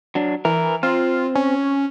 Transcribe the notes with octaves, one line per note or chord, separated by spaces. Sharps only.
F#3 D4
E3 A#4
C4 F4
C#4